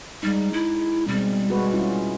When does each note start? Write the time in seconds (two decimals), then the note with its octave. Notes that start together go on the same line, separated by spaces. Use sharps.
0.23 G3 G#3 D#4
0.53 E4
1.08 B2 G3 G#3 C4
1.48 G#3 F#4 B4
1.73 C#4 E4 F4